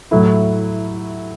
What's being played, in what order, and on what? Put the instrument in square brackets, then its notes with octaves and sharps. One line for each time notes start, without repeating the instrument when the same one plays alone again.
[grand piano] A2 F#3 A3 E4